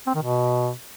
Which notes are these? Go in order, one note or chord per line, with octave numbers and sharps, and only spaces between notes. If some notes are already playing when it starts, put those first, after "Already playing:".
C4
D#3
B2